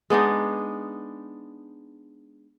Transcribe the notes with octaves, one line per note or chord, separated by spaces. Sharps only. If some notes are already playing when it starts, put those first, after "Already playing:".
G#3 B3 D4 D#4